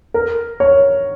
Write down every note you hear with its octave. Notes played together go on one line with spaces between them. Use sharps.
A#4
C#5